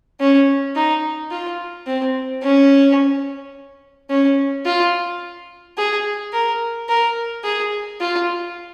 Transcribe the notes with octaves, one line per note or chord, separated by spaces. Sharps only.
C#4
D#4
F4
C4
C#4
C#4
F4
G#4
A#4
A#4
G#4
F4